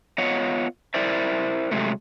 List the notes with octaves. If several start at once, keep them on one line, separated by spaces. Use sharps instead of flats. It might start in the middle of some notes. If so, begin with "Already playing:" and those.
B3 F4 C#5 D#5 F#5
E4 A#4 C5 D5 E5
C3 F#3 G#3 A3